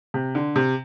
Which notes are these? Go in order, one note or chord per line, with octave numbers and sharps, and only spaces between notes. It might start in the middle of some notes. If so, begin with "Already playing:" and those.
C3
D3
C3